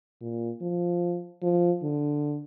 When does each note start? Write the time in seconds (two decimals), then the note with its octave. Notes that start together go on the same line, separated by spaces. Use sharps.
0.21 A#2
0.61 F3
1.43 F3
1.83 D3